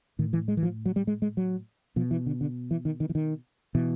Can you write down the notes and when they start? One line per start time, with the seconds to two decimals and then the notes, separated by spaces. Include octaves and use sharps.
0.19 A2 D#3
0.33 E3
0.48 G#3
0.57 E3
0.63 F3
0.86 F#3
0.96 G3
1.07 G#3
1.22 G#3
1.37 F#3
1.96 B2 F3
2.11 E3
2.26 D3
2.41 D3
2.71 E3
2.85 D#3
3.00 D#3
3.09 E3
3.15 D#3
3.75 B2 E3